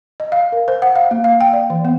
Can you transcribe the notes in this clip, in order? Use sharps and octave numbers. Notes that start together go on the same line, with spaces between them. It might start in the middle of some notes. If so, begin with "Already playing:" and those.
D#5
F5
A#4
C5
F#5
F5
A#3
F5
G5
D5
E3
B3